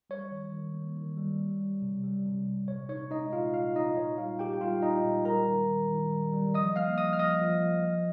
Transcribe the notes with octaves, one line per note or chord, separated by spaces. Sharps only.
G3 C#5
D#3
D#3
A#3
D#3
G3
G3
G3
C3
G3
C3
C3
A#2 C#5
D#4 C#5
G#3 D#4 D#5
A#2 F4 F5
A#2 F4 F5
D#4 D#5
A#2 C#5
G3 F4 F5
A#2 G4 G5
G5
G3 F4 F5
A#2 D#4 D#5
A#2
G3 A#4 A#5
D#3
D#3
D#3
G3
G3
F3 D#5 D#6
A#3 F5 F6
F3 D#5 D#6
F6
F3 D#5 D#6
F3
F3
F3